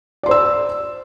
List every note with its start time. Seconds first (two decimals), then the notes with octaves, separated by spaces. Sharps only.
0.23 D5
0.26 C6
0.29 C5
0.31 E6